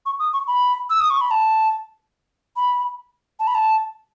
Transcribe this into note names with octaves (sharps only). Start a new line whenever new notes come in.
C#6
D#6
C#6
B5
E6
D#6
C#6
B5
A5
B5
A5
B5
A5